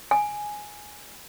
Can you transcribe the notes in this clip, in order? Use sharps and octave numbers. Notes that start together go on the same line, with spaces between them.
G#5